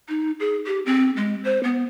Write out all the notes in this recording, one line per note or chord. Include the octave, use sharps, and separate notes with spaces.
D#4
G#4
G4
C4
G#3
C5
B3